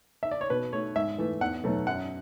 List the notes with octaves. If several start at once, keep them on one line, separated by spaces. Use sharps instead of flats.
E5
D5
C#5
B2 B4
A3 C#5
G#2 E5
E3 A3
E2 F#5
B2 F#3 A3
F#2 F#5